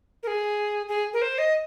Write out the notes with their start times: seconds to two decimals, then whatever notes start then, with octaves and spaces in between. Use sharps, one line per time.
0.23 A#4
0.27 G#4
0.88 G#4
1.13 A#4
1.22 C5
1.38 D#5